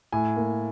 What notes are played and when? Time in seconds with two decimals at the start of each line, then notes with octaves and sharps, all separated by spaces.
0.12 A2 G#5
0.36 A#3